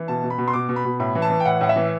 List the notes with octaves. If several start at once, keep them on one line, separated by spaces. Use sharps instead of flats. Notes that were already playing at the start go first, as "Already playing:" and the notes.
Already playing: E3
B2 A5
B2
B5
B2
C6
B2 D6
B2
B5
B2
A2 B5
E3
A5
E3
G5
A2 F#5
A2 F#5
E5
E3